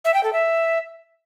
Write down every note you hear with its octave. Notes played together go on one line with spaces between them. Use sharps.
E5
G5
A4
E5